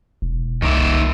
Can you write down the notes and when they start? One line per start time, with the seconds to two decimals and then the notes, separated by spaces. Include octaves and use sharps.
0.22 E1
0.62 C2 D#3 A#3 E5